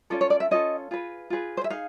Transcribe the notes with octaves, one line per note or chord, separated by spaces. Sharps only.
C#4 F4 A4 D5
C#5
D5
E5
C#4 F4 A4 D#5
F4 G#4 B4
F4 G#4 B4
C5
E5
D#4 G#4 F5